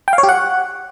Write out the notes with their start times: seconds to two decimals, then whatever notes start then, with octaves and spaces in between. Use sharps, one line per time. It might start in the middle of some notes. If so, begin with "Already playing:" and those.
0.08 G5
0.13 F5
0.18 C#5
0.23 G4
0.29 F#5